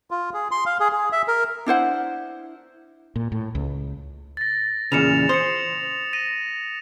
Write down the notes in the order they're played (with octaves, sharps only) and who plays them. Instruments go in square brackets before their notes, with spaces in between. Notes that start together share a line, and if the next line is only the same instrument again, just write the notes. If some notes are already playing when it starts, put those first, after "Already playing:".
[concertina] F4
G#4
C6
F5
G#4
G#4
E5
A#4
[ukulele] D4 E4 C5 F#5
[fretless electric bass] A#2
A2
C#2
[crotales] A6 A#6
[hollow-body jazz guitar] E2 A#2 C#3 [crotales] C#7 E7 F7
[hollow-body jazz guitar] C5 [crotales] D#6 C#7
[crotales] A#6 D#7